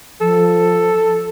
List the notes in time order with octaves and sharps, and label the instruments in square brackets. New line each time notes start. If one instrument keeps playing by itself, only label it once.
[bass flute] F3 [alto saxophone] A4